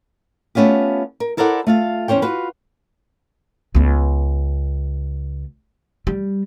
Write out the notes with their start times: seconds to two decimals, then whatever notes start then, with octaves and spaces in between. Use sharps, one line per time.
0.55 A3 B3 C#4 F4 G4
1.20 A#4
1.37 E4 A4 A#4 C5 D5 F#5
1.67 A3 F4 F5
2.08 E2 C#4 C5 C#5 G5
2.22 F4 F#4 B4
3.75 C#2 B3
6.07 G3